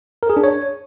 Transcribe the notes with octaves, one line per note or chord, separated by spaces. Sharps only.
A#4
G#4
D4
C#5